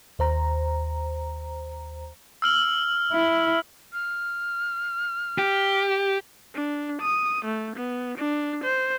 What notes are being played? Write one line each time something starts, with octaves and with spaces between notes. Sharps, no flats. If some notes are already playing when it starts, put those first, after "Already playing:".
D#2 C5 A#5
E6 F6 F#7
E4
F6
G4
D4
D#6
A3
B3
D4
C5